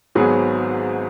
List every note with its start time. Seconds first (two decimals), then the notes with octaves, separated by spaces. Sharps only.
0.15 G#1 G#2 F#3 B3 G#4